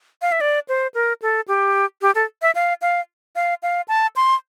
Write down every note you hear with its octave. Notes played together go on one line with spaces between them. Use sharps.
F5
E5
D5
C5
A#4
A4
G4
G4
A4
E5
F5
F5
F5
F5
A5
C6